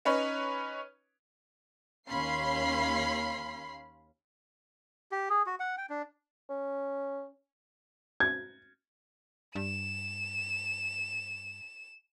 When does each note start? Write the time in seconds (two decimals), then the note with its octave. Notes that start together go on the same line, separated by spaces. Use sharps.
0.05 C#4 D#4 B4 C#5
2.07 D#2 C#4 F5 B5 C6 C7
5.12 G4
5.30 G#4
5.46 F#4
5.60 F#5
5.78 G5
5.90 D4
6.49 C#4
8.20 G#6
9.55 G2 E7